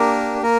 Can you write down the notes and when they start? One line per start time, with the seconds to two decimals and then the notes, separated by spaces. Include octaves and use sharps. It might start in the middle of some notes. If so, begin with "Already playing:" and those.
Already playing: A#3 D4 G4 A#4
0.42 A#3 A#4